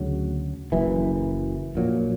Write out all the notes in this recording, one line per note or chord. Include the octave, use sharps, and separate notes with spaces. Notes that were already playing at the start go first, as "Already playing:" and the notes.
Already playing: D2 C#3 F#3
F#1 F#2 E3
A#1 A#2 F#3